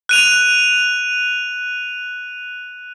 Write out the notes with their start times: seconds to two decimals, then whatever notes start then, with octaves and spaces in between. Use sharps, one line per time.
0.09 F#6 D#7 F7